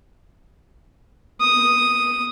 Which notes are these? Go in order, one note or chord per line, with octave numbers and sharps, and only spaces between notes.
D#6